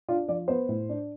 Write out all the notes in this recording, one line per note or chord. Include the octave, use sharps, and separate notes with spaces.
D4 F4
F3 D5
B3 C5
A2
D4